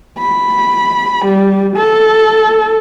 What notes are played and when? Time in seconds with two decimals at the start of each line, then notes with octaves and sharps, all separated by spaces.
0.18 B5
1.25 G3
1.76 A4